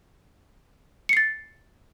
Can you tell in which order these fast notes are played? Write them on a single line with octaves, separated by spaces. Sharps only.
C#7 C7 A6